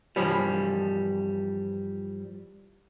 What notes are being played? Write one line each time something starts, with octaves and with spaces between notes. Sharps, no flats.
G2 B2 E3 F3 G3